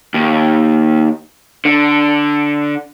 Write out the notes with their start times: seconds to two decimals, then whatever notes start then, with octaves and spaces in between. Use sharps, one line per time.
0.14 D#2
1.65 D3